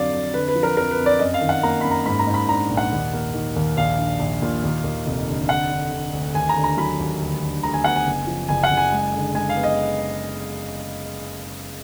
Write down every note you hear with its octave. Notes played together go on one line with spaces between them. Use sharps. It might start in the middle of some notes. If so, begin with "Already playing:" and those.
Already playing: F2 D3 F#3 D5 F5
F2
D3 B4
B4
F3
A#4
F2 A#4
B4
F2
D5
F#2 D#5
F5
D#3
F#5
A#3 A#5
F#2 B5
A#5
G#2 B5
A#5
G#2
B5
D4 A#5
A#1
F#5
D#2
A#3
D#3
D#2
A#1 F5
D4
A#1
A#2
D#2
D#2
F1
D3
D3 F#5
D3
D3
D2
D#2 G#5
A#5
D3
A#5
F#3 B5
D#2
D2
D3
D2 A#5
G#5
B3 F#5
G#5
F#1
F3
F#1 G#5
F#5
F#1
G#5
G#3
D3
G#3 G#5
F5
B3
D#5